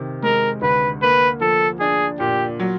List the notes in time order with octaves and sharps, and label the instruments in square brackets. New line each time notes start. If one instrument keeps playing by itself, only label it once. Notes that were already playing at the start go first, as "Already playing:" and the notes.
Already playing: [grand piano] C3 D#3
[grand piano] G#3 [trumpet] A#4
[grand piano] D2 [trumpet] B4
[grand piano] A#3 [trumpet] B4
[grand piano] F3 [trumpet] A4
[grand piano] D4 [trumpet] G#4
[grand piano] A#2 [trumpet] G4
[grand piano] F#3